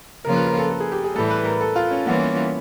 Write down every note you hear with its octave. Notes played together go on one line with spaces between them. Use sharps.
C#3 F3 A#3 C#4 F4 A#4
B4
A#4
A4
A4
G#4
G4
G#4
A2 E3 G3 A4
B4
A#4
A4
F4
C#4
E3 G3 A#3 B3 C#4 F4